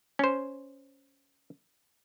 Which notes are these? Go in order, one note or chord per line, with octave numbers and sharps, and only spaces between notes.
C#4 C5